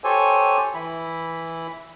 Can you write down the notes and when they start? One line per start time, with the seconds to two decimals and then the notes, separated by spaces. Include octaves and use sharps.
0.04 G4 A4 C5 C#5 G#5
0.74 E3 E4 B5